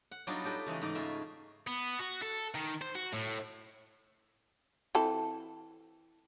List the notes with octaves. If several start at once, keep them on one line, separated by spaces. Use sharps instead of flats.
F#5
F#3 G3 B3 D4 D#4 F4
D#4 G4 A4 B4
C#3 E3 G#3 A3
G#2 A3 D#4 D5
C#3 C#4 F4 E5
B3
F#4
A4
D#3
C5
F#4
A2
E3 C4 A4